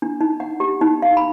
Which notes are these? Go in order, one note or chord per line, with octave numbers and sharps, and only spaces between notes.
D4
D#4
F#5
G4
D#4
F5
B5